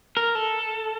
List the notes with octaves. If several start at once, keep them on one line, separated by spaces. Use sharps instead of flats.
A#4
A4